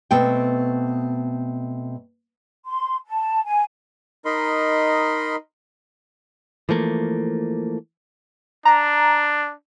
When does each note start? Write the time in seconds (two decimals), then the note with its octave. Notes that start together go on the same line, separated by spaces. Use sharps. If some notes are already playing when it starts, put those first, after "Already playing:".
0.11 B2 A3 C4 G5
2.64 C6
3.06 A5
3.45 G#5
4.25 D#4 A#4 D#5 B5 C6
6.69 E3 F3 A3 A#3
8.65 D4 A#5